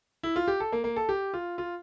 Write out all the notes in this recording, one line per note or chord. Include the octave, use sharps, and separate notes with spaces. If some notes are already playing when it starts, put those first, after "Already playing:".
E4
F4
G4
A4
A#3
A#3
A4
G4
F4
F4